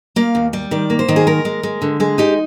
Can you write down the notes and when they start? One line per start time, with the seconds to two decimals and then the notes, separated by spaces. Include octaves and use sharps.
0.16 A#3 F5
0.35 D#2
0.53 G3
0.71 D#3 D5
0.90 A#3
0.99 C5
1.09 D#3
1.16 G#4
1.27 G#3 A#4
1.45 G#3
1.63 G#3
1.82 D3
2.00 G#3 G#4
2.18 D#4 G4